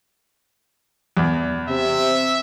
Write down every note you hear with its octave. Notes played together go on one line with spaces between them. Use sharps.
E2
C3 E5